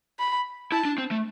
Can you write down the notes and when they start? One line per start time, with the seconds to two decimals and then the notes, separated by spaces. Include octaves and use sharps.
0.19 B5
0.72 E4 A5
0.85 D4
0.98 C4
1.11 A3